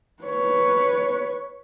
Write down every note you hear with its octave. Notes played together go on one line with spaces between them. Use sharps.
B4 C#5